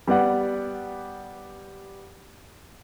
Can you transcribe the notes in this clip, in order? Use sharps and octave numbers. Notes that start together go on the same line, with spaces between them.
G3 B3 D5 F#5